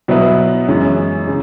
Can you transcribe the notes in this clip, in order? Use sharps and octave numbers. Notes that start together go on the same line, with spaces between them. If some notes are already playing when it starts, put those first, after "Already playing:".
B2 F#3 B3 E4 B4
F#2 E3 G#3 C#4
C#3